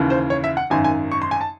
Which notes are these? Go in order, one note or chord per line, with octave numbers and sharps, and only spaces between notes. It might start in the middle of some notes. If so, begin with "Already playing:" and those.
Already playing: D#2 C#3 E3
C5
C#5
E5
F#5
G#1 F#2 D#3 G#5
G#5
C#6
C6
G#5
A5